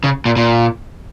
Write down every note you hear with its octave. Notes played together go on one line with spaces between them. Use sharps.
C#3
A#2
A#2